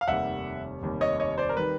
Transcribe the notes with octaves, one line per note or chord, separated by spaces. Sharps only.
F5
F1 D#2 D#3 G3 E5 F#5
F1 D#2 D#3 G3
C#5 D#5
C#5 D#5
C5 D5
A#4
D#3 G3 B4